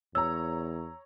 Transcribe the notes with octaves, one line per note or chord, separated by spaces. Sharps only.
E2 C#5 A#5 E6